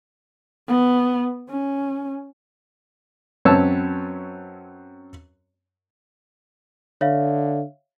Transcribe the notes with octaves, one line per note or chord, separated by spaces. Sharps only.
B3
C#4
F#2 C4 B4 C#5 A5 E6
D3 C#5 E5 F5